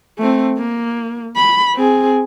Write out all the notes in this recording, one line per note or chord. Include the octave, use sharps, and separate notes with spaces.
A3 C4
A#3
B5
C4 G#4